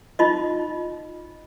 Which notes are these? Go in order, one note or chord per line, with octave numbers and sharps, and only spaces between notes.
D#4 F4 D#5